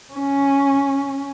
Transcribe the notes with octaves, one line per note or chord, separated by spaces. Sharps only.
C#4